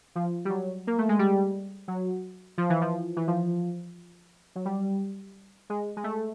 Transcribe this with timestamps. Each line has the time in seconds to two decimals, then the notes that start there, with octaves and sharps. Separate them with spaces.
0.15 F3
0.45 G3
0.50 F#3
0.87 A#3
0.98 A3
1.09 G#3
1.19 G3
1.88 F#3
2.58 F3
2.70 E3
2.81 F3
3.16 E3
3.28 F3
4.55 F#3
4.65 G3
5.70 G#3
5.97 G#3
6.04 A3